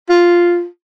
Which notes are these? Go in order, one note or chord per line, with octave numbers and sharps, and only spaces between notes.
F4